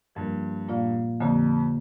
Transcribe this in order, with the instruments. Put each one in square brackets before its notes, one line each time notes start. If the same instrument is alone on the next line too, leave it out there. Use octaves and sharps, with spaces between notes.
[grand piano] G2 [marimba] F3 A#3 F4 A#4
[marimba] A#2 A#3 F4 D5 F5
[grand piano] F2 [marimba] D3 A#3 G4 D5